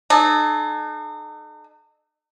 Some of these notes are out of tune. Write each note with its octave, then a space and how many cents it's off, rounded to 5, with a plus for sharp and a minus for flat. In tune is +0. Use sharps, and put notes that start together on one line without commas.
D#4 -40 A4 -35